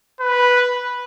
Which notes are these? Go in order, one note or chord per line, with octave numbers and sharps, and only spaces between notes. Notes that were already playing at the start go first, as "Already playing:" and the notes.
B4